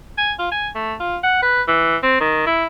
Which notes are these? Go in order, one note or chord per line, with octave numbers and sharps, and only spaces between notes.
G#5
F4
G#5
A3
F4
F#5
B4
E3
C4
D#3
E4